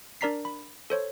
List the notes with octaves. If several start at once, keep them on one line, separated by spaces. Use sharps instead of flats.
D4 A#4 D5 A#5 B6 C7
B5
A4 C5 C#5